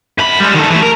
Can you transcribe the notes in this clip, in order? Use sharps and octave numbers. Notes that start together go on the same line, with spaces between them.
F#2 B5
G3 G#3
D#3 A4
E3 A3
A#4